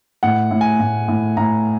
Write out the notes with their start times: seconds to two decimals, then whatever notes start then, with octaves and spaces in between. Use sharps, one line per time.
0.23 A2 F#5
0.51 A2
0.61 G#5
0.79 A2
1.08 A2
1.37 A2 A#5